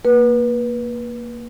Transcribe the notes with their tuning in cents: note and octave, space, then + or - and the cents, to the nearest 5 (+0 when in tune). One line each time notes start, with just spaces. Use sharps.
A#3 +0 B4 -25